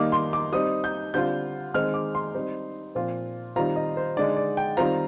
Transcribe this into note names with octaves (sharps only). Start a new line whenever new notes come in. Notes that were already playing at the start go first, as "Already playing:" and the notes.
Already playing: D#3 G3 A#3 D#4 D6
C6
D6
G3 C4 D#4 D#6
G6
D3 G3 C4 F4 G6
D#3 G#3 C4 D#4 F6
D6
C6
G3 C4 D#4
A#2 F3 C4 F4
D#3 G3 C4 F4 A#5
D#5
C5
D3 G#3 D#4 D5
D5
G5
D#3 G3 C4 F4 A#5